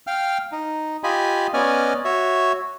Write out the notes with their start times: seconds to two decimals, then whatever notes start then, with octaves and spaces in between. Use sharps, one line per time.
0.07 F5 G5 F6
0.52 D#4
1.04 F4 G4 D#5 G#5 B5
1.54 B3 C#4 D5 D#5 G#5 F6
2.05 F#4 C#5 E5